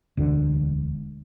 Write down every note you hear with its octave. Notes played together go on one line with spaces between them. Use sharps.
E1 D2 D3